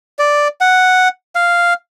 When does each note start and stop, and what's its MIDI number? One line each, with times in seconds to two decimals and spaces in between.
0.19 0.48 74
0.61 1.08 78
1.35 1.73 77